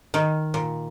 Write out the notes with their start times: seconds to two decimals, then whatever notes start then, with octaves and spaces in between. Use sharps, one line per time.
0.14 D#3
0.54 A#2